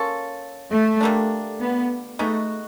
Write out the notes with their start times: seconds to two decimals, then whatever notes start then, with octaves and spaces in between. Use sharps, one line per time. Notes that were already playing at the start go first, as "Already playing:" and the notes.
Already playing: A#3 C#4 F4 A4
0.72 A3
1.01 D3 G3 A#3 D4
1.61 B3
2.19 G#3 A3 B3 D#4 F#4